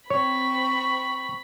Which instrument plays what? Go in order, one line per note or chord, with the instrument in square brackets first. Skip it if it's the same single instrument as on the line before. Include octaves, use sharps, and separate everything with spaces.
[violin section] C4 [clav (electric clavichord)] C#5 [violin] B5 [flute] C#6